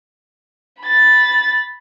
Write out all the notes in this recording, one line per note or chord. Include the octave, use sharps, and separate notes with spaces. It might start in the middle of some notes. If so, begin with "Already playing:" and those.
B5 A6